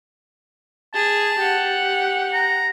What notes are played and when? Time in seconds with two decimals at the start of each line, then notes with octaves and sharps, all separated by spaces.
0.94 G#4 A5
1.39 G4 F#5
2.33 A#5